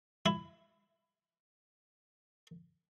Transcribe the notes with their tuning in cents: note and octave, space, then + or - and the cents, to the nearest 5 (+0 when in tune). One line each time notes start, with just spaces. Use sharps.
E4 +15